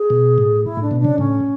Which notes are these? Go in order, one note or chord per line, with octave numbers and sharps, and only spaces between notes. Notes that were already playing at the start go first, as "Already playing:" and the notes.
Already playing: G#4
B2
A2
E4
A2 D4
B2
C#3 D4
A2 C#4